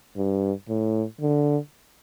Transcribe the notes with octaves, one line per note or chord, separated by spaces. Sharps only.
G2
A2
D3